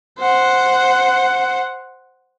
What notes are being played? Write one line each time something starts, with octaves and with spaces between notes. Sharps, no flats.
C5 F#5